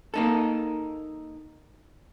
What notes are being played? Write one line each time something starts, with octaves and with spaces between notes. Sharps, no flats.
A#3 D#4 A4